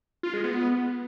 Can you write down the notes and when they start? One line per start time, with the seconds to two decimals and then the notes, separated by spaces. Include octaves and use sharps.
0.23 F4
0.34 G#3
0.44 B3